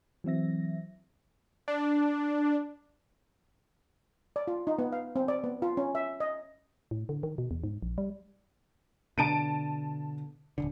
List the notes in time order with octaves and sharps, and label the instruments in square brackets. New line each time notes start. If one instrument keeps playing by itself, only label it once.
[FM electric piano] E3 F#3 C4 E5 A#6
[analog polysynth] D4
[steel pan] D5
F4
D#4
B3
F5
C4
D5
B3
F4
C#4
E5
D#5
[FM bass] A2
D3
D#3
B2
E2
G#2
A#1
G3
[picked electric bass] B2 D3 [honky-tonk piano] A5 D7 D#7
[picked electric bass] D1 G#1 D3